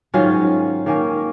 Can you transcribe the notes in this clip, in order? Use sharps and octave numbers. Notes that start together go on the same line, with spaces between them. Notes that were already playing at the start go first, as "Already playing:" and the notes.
G#2 D#3 F#3 C#4 F4
D#3 A#3 C#4